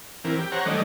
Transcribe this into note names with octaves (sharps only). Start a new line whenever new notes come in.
E3 C4 A#4
G4
C5 C#5 F#5 A#5
D#3 G3 A3 C#4 D5 D#5